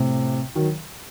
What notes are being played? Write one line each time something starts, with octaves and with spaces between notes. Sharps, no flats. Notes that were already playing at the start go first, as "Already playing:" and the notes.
Already playing: A2 C3
D#3 F#3